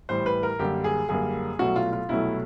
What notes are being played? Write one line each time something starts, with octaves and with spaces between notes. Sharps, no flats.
A2 E3 G3 C5
B4
A#4
F#2 D3 G3 A#3 G4
G#4
F#2 D3 G3 A#3 G#4
C2 B2 F#3 A3 F#4
F4
F4
C2 B2 F#3 A3 E4